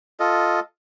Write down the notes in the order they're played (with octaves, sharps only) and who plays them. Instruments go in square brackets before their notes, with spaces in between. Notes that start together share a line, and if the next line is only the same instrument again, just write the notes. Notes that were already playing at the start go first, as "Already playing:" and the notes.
[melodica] F4 A4 D#5